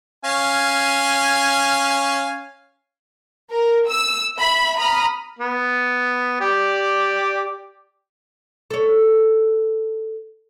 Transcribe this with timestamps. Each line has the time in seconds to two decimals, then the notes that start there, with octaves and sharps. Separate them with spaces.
0.25 C#4 F5 G#5
3.51 A#4
3.89 E6
4.37 E5 B5
4.77 A#5 B5 D#6 F6
5.39 B3
6.41 G4 D5
8.71 A4 C#5